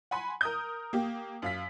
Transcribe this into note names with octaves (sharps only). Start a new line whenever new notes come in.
F#5 G#5 B5 C6
A#4 D#6 G6
A#3 G4
F#2 F5 B6